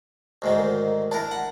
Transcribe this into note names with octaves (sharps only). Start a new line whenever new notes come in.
D2 G#2 D#3
A#4
D4 E4 A#4 A5
F#5